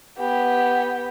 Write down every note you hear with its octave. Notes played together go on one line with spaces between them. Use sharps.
B3 G4